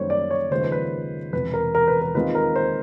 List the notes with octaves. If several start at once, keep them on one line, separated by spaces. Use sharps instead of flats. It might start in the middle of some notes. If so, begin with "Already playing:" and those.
Already playing: F#2 D#3 G3 A#3 C#4 C5 C#5
D5
C#5
D#2 C#3 F3 G#3 C5
B4
B4
E1 E2 C3 B4
A#4
A#4
B4
A#4
D#2 D#3 G#3 C4 F4 B4
A#4
C5